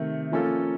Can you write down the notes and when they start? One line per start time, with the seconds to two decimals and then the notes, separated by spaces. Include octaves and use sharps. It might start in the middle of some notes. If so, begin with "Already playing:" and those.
Already playing: C3 D#3 A3
0.32 F3 A#3 C#4 F4 A4